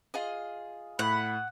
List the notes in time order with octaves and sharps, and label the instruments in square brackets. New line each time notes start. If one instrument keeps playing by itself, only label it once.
[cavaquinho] F4 G#4 D#5
[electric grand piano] A2 [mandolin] F#5 [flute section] B5